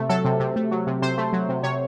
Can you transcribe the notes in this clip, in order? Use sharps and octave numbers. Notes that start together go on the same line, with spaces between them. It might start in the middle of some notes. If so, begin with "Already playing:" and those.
Already playing: C3 A3
F#3 A4
C3
C3
A3
F#3
C3
C3 C5
A3
F#3
C3
C3 C#5